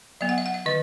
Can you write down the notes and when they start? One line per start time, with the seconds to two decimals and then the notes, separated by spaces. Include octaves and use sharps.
0.21 F#3 B3 E5
0.29 F#5
0.38 E5
0.46 F#5
0.54 E5
0.66 D#3 D#5